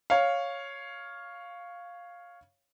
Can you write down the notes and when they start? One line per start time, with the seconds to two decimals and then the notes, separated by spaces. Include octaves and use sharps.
0.10 C#5 F5